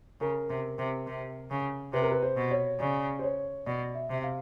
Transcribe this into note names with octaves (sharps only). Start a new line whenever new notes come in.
C#3 A#4
C3
C3
C3
C#3
C3 B4
A#4
B4
C5
B2
C#5
C#3 D5
C5
C#5
B2 D5
E5
C3
F5